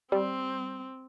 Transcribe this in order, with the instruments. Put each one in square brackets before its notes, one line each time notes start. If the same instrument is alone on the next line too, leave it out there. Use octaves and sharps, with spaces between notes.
[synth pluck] G3 [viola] C4